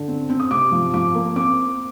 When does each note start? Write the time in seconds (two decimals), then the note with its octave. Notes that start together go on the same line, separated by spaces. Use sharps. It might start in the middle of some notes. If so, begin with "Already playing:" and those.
Already playing: D3
0.08 C4
0.30 C4
0.40 D#6
0.51 C3 D6
0.72 F3
0.94 F3 D6
1.15 A#3
1.36 C4 D6